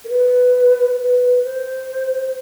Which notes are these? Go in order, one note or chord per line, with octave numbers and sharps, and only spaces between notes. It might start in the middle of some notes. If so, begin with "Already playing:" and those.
A#4
B4
B4
C5